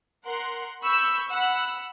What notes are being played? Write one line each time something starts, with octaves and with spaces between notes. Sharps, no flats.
A#4 F#5 C6
B5 C#6 E6 G6
F#5 B5 E6